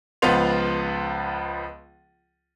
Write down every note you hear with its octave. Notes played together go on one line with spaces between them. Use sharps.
C#2 F3 B3 F4 C6 F7